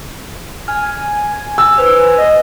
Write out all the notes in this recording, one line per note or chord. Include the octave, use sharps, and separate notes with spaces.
G#5 F6
E6
B4 C5
D#5